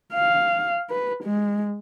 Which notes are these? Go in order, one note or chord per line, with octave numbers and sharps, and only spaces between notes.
F5
B4
G#3